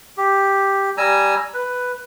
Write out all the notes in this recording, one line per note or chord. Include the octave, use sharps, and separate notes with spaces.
G4
G3 G#5 A#5 E6
B4